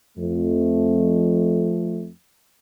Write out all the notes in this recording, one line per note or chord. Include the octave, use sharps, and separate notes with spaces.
F2 A3